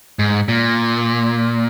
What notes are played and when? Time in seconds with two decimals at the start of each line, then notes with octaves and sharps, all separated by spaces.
0.19 G#2
0.48 A#2